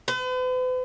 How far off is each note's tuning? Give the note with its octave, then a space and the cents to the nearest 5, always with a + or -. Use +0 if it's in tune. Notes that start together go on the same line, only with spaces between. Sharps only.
B4 +45